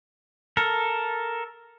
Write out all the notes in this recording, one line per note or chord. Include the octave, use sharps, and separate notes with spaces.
A4 A#4